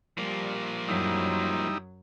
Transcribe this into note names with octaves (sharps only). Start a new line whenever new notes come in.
F3 G3 A#3
F#2 F#3 G3 D#4 E4